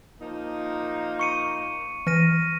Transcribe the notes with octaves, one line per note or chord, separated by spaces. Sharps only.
F3 A#3 D#4
C#6 C#7 D#7
E3 F6 A#6 D#7